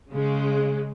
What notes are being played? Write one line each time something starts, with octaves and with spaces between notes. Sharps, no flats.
C#3 G#3